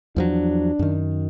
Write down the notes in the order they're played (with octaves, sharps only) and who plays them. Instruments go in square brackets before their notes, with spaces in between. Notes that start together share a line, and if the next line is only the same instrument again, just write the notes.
[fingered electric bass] E2 F3 F#3 [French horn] D4
[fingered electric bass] F#2 D#3